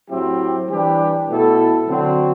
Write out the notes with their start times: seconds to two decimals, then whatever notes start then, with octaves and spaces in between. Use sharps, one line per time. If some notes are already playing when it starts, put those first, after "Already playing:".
0.09 A2 F#3 C4 E4 G4
0.68 E3 G3 D4 G4 B4
1.28 B2 A3 E4 A4
1.87 D3 F#3 C4 F#4